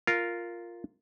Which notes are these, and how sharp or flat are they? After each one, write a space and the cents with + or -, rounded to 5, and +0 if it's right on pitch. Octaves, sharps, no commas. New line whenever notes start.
F4 -5 A#4 -5